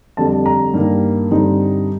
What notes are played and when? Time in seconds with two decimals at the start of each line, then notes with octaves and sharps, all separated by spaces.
0.17 F2 D3 G3 A5
0.46 A#5
0.74 G2 D#3 A#3
1.31 G2 D3 G3 C4 D#4